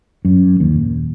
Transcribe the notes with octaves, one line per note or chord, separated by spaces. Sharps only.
F#2
D#2
D#1